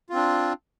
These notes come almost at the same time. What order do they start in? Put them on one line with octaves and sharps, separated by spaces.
F4 C4 D4